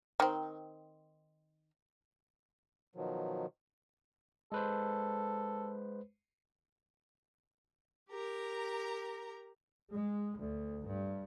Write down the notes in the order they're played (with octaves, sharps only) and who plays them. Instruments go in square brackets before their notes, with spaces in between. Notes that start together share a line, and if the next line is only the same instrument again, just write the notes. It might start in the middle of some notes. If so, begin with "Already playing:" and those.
[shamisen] D#3 C4
[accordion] B2 D#3 F3 F#3
[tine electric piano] G#3 B4 C5 [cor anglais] A4
[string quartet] G4 A#4 A#5
[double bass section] G#3
D2
G2